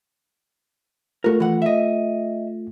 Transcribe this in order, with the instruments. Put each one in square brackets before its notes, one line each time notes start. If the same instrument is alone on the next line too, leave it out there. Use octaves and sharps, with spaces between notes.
[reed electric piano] A3 F4 [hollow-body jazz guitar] F#4 A#4
[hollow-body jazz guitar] E3 F#5
D#5 E5